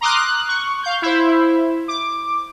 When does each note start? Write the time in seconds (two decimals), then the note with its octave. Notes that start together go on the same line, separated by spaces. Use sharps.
0.01 A#5 C6 D6 D#6 F6 F#6
0.16 F#6
0.48 C#6
0.83 F5 G6
1.02 E4 C5
1.88 D6